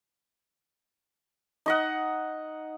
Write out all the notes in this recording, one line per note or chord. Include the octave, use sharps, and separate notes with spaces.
D#4 D#5 F#5